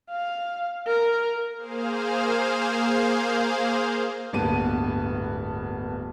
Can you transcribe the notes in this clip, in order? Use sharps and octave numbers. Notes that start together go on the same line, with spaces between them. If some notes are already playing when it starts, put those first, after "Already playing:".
F5
A#4
A#3 G#4 C5 F5
D1 G2 A#3 B3 A5 D#7